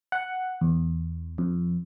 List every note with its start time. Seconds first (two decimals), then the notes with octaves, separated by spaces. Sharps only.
0.12 F#5
0.61 E2
1.38 F2